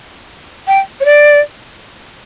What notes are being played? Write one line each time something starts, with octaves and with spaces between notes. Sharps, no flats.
G5
C#5
D5